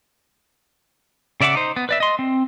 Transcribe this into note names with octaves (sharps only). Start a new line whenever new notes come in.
C#3 D5 E5 F#5 D6
D#4 C5
B3
B4 D5 E5
D#5 C6
C4